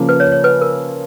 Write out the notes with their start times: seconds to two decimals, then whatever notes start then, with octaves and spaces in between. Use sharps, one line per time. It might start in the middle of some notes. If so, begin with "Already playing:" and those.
Already playing: C#3 F3 A#3
0.09 B4
0.20 C#5
0.32 C#5
0.44 B4
0.61 A#4